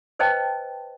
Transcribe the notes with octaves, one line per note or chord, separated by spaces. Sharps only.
B4 C5 D#5 G5 A5